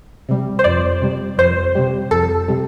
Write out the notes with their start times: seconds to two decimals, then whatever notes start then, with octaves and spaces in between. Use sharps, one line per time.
0.29 C3 G3
0.59 C5
0.64 F2 D5
1.01 C3 G3
1.38 F2 C5
1.75 C3 G3
2.11 F2 A4
2.48 C3 G3